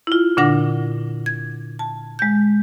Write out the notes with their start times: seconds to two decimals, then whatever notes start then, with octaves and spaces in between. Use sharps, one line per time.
0.07 E4 F4
0.37 A#2 D3 D4 F#5 A#6
1.26 G#6
1.79 A5
2.19 G#3 G6